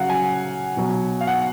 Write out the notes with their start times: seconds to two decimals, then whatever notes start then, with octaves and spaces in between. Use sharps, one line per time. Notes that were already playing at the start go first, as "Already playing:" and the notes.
Already playing: C#3 F#3 F5 F#5
0.10 G#5
0.77 B2 F#3
1.21 F5
1.27 F#5